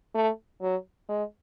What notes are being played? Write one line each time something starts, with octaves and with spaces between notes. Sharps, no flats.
A3
F#3
G#3